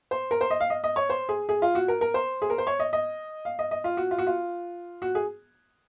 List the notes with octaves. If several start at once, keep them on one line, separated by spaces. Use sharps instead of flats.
C5
A#4
C5
D#5
F5
D#5
D#5
C#5
C5
G#4
G#4
F4
F#4
A#4
A#4
C5
G#4
A#4
C5
C#5
D#5
D#5
F5
D#5
D#5
F4
F#4
F4
F#4
F4
F#4
G#4